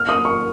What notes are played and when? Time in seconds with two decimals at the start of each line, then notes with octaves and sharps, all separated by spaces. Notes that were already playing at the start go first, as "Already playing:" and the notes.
Already playing: F6
0.09 D#6
0.25 C#6